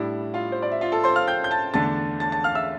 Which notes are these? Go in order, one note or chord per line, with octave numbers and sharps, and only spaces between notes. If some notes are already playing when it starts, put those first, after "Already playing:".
Already playing: A2 G3 D4 E4 E5
F4 F5
C5
D5
E5
F4 F5
A4 A5
C5 C6
F5 F6
G5 G6
G6
A5 A6
E2 D3 A3 D4 A5 A6
A5 A6
A5 A6
F5 F6
E5 E6